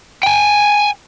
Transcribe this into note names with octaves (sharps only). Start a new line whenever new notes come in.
G5 G#5